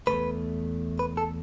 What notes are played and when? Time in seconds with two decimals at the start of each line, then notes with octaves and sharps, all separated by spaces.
0.07 B2 A3 B4
0.12 E2
0.99 B4
1.17 A4